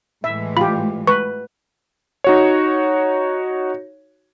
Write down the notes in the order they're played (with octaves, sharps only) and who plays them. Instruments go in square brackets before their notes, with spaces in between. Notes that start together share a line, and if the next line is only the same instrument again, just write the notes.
[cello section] A2 E3 G#3 [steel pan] E5
[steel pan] F4 G4 [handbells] B5
[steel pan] B4 [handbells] C#6
[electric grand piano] D#4 F#4 C#5